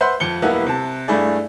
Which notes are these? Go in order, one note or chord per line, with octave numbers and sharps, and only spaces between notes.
B4 C5 E5 F#5 C6 G6
F2 F3 C#7 G7
D#1 B1 A#3 B3 E4 F#6
C3 A5
G2 A3 E4 G#4 D5